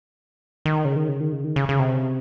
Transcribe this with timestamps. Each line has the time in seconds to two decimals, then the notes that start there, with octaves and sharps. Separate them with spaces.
0.66 D#3
0.85 C#3
0.96 D#3
1.09 C#3
1.20 D#3
1.32 C#3
1.44 D#3
1.56 C#3
1.69 C#3
1.79 C3